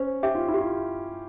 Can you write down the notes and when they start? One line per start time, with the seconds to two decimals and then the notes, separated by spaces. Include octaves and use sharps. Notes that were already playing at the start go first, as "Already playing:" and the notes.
Already playing: C#4 C5
0.23 G4 E5
0.35 F4
0.48 E4
0.54 G4
0.61 F4